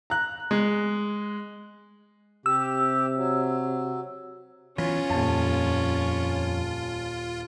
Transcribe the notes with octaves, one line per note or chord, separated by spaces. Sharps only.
A#5 F#6
G#3
C3 G4 E6
F#3
E3 F#3 B3 C#4 F4
D#1 F2 A5